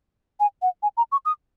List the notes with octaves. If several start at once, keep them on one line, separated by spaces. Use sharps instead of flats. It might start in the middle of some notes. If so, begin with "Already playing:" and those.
G#5
F#5
G#5
A#5
C#6
D#6